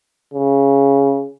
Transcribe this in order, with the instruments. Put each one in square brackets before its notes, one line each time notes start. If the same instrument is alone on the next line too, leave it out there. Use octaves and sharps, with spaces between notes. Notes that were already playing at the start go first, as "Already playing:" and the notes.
[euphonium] C#3